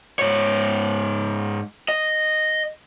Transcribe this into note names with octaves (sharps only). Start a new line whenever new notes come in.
G#2 C#5
D#5